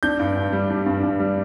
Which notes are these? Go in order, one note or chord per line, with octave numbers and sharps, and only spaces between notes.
D4 G6
G2
G2
G3
D4
G2
G2
G3